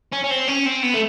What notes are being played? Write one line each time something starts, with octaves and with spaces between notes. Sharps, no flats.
C#4
C#4
C4
C#4
C4
B3
A3